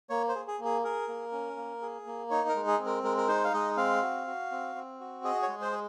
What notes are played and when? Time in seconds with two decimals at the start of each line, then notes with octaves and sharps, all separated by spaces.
0.10 A#3 C#5
0.29 C5
0.35 G#4
0.48 G#4
0.59 A#3
0.65 G#4
0.84 G#4 A#4
1.08 A#3
1.32 C#4
1.57 A#3
1.82 G#4
2.06 A#3
2.30 D#4 C#5
2.49 A#4
2.56 G#3
2.67 G#4
2.79 C4
2.86 A#4
3.03 G#3 A#4
3.17 A#4
3.28 D#4 C5
3.44 F5
3.53 G#3 D#5
3.77 C4 F5
4.02 F#4
4.27 F#4
4.51 C4
4.75 C4
5.00 F#4
5.24 G#4 D#5
5.42 C#5
5.49 G#3
5.62 C5
5.72 G#4